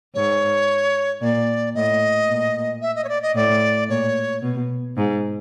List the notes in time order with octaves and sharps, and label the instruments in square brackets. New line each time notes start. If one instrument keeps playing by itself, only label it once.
[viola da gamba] G#2 [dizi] C#5
[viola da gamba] A#2 [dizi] D5
[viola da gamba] A2 [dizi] D#5
[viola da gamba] A#2
[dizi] E5
D#5
C#5
D5
D#5
[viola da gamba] A2 [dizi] D5
[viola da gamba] A#2 [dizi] C#5
[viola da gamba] B2
G#2